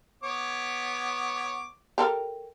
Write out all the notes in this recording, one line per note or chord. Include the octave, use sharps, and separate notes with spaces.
B3 C#5 D6
G4 A4 A#4